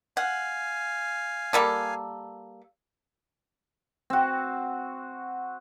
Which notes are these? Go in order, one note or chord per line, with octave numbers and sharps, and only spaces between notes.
F5 F#5 G#5
G3 A#3 A4
C4 F#4